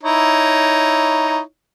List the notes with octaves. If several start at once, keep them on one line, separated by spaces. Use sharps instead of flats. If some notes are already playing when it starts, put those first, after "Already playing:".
D#4 E4 C#5